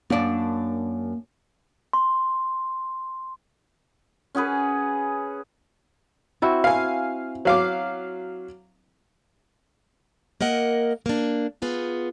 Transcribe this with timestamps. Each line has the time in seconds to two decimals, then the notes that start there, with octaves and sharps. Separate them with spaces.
0.10 F#2 A#3 D4
1.93 C6
4.35 C#4 F#4 G#4 B4
6.42 C4 E4 F#4
6.64 F5 G#5
7.45 F#3 F5 D6
10.41 A#3 A#4 D#5 F#5
11.06 A#3 D4
11.62 B3 F4 G#4